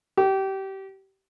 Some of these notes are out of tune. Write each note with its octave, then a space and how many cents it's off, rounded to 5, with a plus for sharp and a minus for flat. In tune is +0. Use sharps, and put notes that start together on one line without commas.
G4 -25